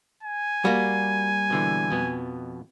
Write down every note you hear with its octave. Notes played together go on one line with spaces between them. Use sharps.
G#5
G3 A#3 F#4
B2 D3 E3
F2 B2 B3